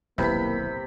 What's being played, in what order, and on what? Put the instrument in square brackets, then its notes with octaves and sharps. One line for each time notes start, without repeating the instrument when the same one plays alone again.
[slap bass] D#1 B1 [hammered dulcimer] C3 B5 [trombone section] A#3 [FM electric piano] E4 B4 E5